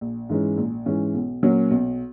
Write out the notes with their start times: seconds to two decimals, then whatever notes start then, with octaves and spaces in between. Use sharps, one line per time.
0.01 A#1
0.29 G#2 E3 G#3 C#4
0.57 A#1
0.86 G#2 E3 G#3 C#4
1.14 B1
1.43 A#2 F#3 A#3 C#4
1.71 B1